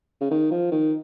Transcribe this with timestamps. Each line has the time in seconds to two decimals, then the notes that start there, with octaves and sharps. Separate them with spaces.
0.21 C#3
0.31 D#3
0.51 F3
0.71 D#3